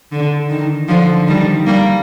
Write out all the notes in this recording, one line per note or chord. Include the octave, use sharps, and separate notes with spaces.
D3
D#3
D3 F3
D#3 G3
G3 A#3